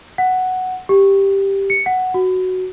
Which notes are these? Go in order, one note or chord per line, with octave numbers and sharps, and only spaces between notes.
F#5
G4
C#7
F#5
F#4